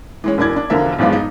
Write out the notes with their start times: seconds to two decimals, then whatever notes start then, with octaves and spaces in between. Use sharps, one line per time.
0.24 E3 G#3 C#4
0.38 E1 E3 D4 G#6
0.56 D4
0.70 E1 D3 F3 A#4 E5
0.99 B1 E2 G2 F3 G#3 B3
1.12 D#4